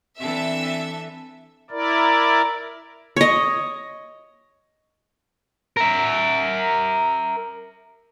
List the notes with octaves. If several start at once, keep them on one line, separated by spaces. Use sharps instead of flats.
E3 C4 D4 A4 E5
E4 A#4 D5
C#5 D#5
A#4 E5